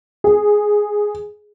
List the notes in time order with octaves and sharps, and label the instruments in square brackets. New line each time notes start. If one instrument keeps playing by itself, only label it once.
[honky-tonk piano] G#4